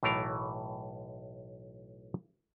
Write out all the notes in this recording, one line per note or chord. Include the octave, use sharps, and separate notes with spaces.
B1 A2 E3 A3 A#4 F5